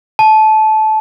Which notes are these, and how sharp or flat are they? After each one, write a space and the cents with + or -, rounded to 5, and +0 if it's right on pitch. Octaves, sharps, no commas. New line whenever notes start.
A5 -20